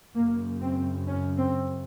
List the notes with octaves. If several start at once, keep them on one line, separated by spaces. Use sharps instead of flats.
F#2 C#3 A#3
C4
C#4
C4